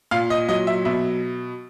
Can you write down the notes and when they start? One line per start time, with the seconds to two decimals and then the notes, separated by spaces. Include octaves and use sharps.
0.11 A#2 F5
0.30 D#5
0.48 F#3 D#5
0.67 E5
0.85 B2 E5